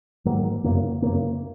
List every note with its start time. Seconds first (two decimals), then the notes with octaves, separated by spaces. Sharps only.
0.25 G#2 D#3 F#3 A#3
0.64 F#2 C#3 A#3
1.02 F#2 C#3 A#3